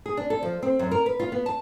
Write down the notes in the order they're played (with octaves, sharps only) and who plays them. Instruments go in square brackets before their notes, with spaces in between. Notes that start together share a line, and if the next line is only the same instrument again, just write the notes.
[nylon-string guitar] G#4
D4
A4
F3
C4
F#2
A#4
B4
F4
B3
A5